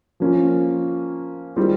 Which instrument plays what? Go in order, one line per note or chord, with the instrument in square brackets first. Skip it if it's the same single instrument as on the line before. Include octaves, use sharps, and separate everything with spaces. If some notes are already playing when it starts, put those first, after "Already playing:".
[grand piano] F3 A#3 C#4 F4
D#3 G3 C4 F4 G#4